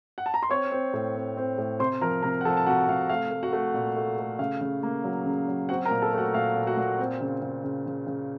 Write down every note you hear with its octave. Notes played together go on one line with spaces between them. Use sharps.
F#5
A5
A#5
C6
C4 C#5 C#6
C4
A2
C4
C4
A2
C3 C5 C6
F3 A#4 A#5
C3 A#4 A#5
F#5
F3 A4 A5
A5
C3 F#4 F#5
C3 F5
A3 F5
A3
F#4 F#5
A3
A#2
A3
A3
C#3 F5
C#3
A#3
F#3
C#3
F#3
C4 F#4 F#5
A#4 A#5
A#2
A4 A5
A3 F#4 F#5
A#2 F5
A#2
F#4 F#5
A#2
C4
C#3
C#3
C#3
C#3
C#3